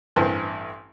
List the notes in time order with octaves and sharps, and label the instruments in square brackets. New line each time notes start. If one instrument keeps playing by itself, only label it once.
[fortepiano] A1 G2 E3 C4